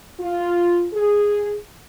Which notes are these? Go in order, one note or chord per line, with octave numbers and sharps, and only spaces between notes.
F4
G#4